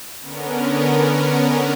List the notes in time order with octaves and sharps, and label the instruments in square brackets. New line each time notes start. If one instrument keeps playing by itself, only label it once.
[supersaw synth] D3 B3 C#4 A#4